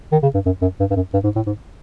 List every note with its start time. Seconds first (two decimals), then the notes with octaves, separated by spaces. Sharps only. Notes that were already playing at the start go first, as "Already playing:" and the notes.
0.12 D#3
0.23 C#3
0.34 G2
0.46 F#2
0.62 F#2
0.80 G2
0.90 G2
0.96 F#2
1.14 G2
1.24 G#2
1.36 A2
1.47 G#2